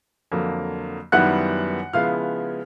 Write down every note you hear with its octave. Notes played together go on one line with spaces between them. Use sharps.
F2 D3 F#3 A#3
F#2 D#3 G3 B3 E4 F#5 F#6
C#3 F3 G#3 B3 E4 F5 F6